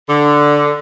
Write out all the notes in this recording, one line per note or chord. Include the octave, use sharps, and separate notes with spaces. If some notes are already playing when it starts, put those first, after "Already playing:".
D3